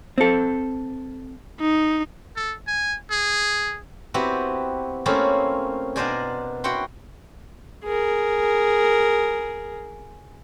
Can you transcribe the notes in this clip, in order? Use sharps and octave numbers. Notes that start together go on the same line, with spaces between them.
C4 A4
D#4
A4
G#5
G#4
B3 C4 E4 F#4 G4 B4
A3 A#3 C4 C#4 E4 F4
B2 D4 A#4 C5 D5 G#5
E4 F#4 F#5 G5 C6
G#4 A#4